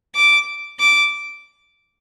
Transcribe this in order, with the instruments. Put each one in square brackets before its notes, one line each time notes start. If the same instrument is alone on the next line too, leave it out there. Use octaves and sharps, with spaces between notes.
[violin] D6
D6